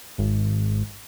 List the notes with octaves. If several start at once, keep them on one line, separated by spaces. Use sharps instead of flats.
G#1